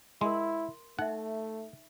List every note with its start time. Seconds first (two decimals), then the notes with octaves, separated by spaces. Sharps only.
0.21 G#3 E4 A#4 C6
0.99 A3 D#4 E5 F#5